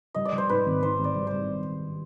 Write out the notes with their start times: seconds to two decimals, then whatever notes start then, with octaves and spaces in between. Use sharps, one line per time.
0.14 G3 D#5
0.25 D5
0.33 G3
0.38 C5
0.49 G#2 B4
0.66 G#1
0.83 D#3 C5
0.99 G#1
1.04 D5
1.15 G3
1.27 G3 C5